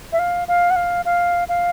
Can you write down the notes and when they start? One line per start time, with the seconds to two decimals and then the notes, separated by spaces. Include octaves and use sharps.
0.12 E5
0.19 F5
0.48 F5
0.70 F#5
0.76 F5
1.05 F5
1.49 F5